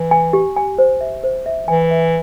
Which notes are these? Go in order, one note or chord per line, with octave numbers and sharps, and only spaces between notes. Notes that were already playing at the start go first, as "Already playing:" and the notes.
Already playing: E3
G#5
G4
G#5
C5
E5
C5
E5
E3 G#5
E5